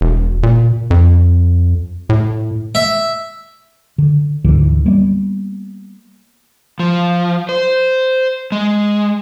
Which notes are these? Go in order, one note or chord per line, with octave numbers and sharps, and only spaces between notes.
E1
A#2
F2
A2
E5
D3
D2 G#2 D3 E3
G3 A#3 B3
F3
C5
G#3